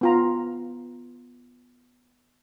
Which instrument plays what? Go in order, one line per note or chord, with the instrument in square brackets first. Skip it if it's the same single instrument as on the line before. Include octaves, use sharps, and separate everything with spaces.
[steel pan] B3 F4 A#5